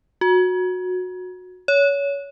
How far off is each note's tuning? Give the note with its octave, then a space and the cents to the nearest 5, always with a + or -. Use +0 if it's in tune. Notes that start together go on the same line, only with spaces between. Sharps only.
F#4 -20
C#5 +25